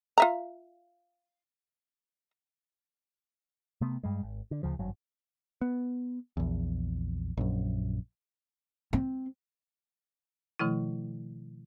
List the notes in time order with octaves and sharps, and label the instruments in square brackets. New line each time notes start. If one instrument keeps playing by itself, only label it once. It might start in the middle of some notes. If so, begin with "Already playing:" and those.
[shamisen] F4 E5 A#5
[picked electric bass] C3 A3 B3
G2 G3 G#3
G#1
D3
D2 C#3 F3
G#1 G2 F#3
B3
A#1 E2
A#1 F#2
[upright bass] C4
[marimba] B2 D#3 F3 A3 E4